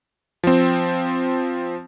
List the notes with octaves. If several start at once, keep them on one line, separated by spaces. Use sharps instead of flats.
F3 C4